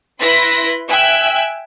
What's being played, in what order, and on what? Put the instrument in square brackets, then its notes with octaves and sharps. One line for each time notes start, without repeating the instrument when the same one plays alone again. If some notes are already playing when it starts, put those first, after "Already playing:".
[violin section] E4 B4 C6 F#6 A#6 B6
E5 G5 G#5 E6 F#6